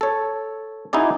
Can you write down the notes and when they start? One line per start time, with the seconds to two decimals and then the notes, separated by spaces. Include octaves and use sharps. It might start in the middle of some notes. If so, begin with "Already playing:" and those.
0.01 A4 C#5
0.93 D#4 E4 F#4 G#4 D5